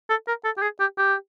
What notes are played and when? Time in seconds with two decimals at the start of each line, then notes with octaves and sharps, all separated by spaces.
0.10 A4
0.28 A#4
0.45 A4
0.58 G4
0.62 G#4
0.80 G4
0.98 G4